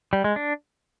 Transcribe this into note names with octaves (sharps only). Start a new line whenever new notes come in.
G3
G#3
D4